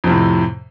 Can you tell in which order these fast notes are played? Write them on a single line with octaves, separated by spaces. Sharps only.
F2 C3 A2